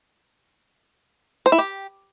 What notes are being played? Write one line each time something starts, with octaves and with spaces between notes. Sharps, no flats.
C5
E4
G4